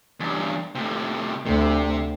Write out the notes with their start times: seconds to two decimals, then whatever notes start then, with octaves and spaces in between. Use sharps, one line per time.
0.20 E2 G2
0.75 A2 C3
1.46 D2 C3